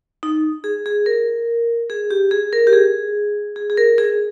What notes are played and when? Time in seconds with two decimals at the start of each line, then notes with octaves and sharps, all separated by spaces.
0.23 D#4
0.64 G#4
0.86 G#4
1.06 A#4
1.90 G#4
2.11 G4
2.31 G#4
2.53 A#4
2.67 G4
2.73 G#4
3.56 G#4
3.70 G#4
3.77 A#4
3.98 G#4